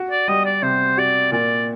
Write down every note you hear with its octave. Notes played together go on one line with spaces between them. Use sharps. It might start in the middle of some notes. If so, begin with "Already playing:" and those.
Already playing: F#4
D5
G3 D#5
D5
C3 C5
F#4 D5
A#2 D5